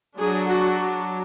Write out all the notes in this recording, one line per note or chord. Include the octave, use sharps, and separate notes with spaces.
F#3 D4 G#4
F#4